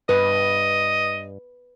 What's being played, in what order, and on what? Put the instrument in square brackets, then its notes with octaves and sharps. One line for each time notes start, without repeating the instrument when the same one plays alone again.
[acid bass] G2 [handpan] B4 [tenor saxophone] D#5